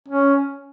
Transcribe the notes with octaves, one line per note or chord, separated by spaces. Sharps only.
C#4